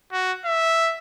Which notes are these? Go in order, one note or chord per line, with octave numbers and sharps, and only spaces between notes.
F#4
E5